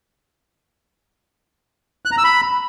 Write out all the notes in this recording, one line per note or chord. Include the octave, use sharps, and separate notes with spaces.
F#6
A#5
E6
B5